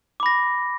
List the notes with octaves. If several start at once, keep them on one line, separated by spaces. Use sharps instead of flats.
B5 D6 A#6